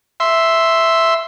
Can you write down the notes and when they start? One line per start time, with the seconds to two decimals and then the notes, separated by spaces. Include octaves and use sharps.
0.20 E5 C6